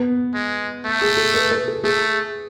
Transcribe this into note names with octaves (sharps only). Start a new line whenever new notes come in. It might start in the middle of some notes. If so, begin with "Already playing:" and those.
Already playing: B3
G#3
A3
G#4
A4
B4
B4
A4
A3 G#4